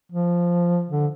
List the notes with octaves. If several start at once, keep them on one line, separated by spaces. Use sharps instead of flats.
F3
D3